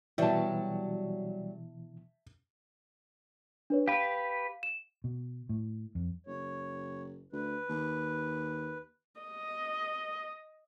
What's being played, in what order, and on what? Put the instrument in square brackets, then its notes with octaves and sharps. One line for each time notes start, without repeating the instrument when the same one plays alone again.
[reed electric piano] B2 E3 [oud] F#3 G3 [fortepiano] E5 A5
[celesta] D4 B4 C#5
[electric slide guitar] G4 B4 [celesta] F5
[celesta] E7
[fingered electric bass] B2
A2
F2
[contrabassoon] F#1 [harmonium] C#5
[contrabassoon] D2 [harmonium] B4
[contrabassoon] D#2
[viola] D#5